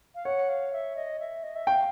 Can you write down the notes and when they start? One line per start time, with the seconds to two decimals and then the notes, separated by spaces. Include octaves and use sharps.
0.15 F5
0.25 C#5 F#5
0.49 F5
0.73 E5
0.96 D#5
1.20 E5
1.43 D#5
1.56 E5
1.67 F5 G5